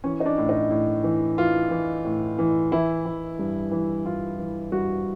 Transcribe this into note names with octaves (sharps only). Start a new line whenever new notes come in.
E3 C#4
D#4
D4
A2
D#4
A2
E3
E3 F4
E3
A2
E3
E3 E4
E3
G2
E3
E3 F4
E3
G2 F#4